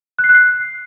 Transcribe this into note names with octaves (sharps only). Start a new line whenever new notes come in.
F#6
C7
F#6
C7